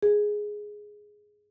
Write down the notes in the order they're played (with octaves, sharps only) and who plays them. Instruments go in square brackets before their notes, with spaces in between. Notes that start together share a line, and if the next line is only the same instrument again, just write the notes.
[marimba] G#4